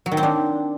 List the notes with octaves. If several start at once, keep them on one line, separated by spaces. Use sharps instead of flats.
F#3
D#3
C4
D4